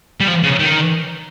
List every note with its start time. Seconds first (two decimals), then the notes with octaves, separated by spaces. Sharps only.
0.20 G3
0.28 F3
0.43 C#3
0.59 D#3